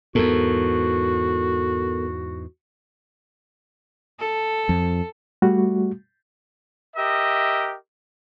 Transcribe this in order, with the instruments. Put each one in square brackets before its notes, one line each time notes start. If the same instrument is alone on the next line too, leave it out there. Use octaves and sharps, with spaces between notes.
[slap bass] E2 G#2 [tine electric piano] B3 A4 A#4 [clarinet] F#4
[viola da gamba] A4
[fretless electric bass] F2
[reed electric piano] G3 A3 F#4
[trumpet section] G4 A#4 D#5 E5